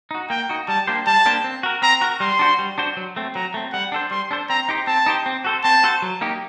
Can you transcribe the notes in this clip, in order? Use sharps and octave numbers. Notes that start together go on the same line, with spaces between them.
D#4 F#4
A#3 G5
D#4 F#4
G3 A5
A#3 D4 G4 C5
G3 A5
A#3 D4 G4 C5
C4
F#4 A#4
C4 A#5
F#4 A#4
G3 C6
D4 F#4 C5
G3
D4 F#4 C5
F#3
A3 C4
F#3 A#5
A3 C4
G3 F#5
D4 A4 C5
G3 C6
D4 A4 C5
C4 A#5
D#4 G4 C5
C4 A5
D#4 G4 C5
C4
F#4 A4 C5
C4 A5
F#4 A4 C5
F#3
A#3 D#4 G4